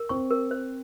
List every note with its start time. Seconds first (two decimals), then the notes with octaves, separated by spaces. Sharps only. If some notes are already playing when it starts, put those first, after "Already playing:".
Already playing: A#4
0.09 C4 C#6
0.31 A#4
0.51 C5